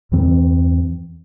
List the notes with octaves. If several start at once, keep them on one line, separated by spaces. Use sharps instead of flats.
E2 G2 E3 C4